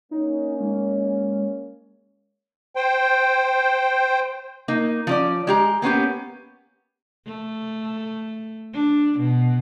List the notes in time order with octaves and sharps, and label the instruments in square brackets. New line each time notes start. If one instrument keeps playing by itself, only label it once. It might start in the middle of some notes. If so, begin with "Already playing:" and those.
[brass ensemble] A#3 C#4 [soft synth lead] D#4
[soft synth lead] G#3
[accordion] C5 G5
[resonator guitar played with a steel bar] A#3 D#4
F3 C#4 D5
G#3 G4 A#5
A#3 B3 C#4 G4
[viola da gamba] A3
D4
B2